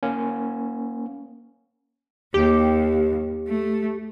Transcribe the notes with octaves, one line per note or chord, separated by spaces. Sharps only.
A#3 C#4
D#2 G4
A3